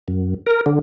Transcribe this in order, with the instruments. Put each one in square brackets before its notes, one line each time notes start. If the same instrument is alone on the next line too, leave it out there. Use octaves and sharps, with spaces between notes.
[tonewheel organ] F#2
A#4
D3